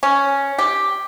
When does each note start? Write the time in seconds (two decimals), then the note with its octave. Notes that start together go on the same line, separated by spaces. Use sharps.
0.03 C#4
0.58 G4